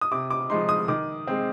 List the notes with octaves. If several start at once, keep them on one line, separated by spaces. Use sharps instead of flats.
D#6
C3 D6
D6
F3 G#3 D#4 C6
D#6
D#3 D6
G#3 C4